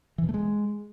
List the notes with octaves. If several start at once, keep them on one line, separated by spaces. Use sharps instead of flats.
E3
B2
A3
G#3